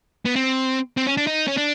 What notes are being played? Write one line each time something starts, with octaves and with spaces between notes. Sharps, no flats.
B3
C4
C4
C#4
D4
D#4
C#4
D4